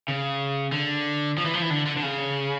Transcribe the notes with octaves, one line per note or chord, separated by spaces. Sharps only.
C#3
D3
F3
E3
F3
E3
D3
D3
D3
C#3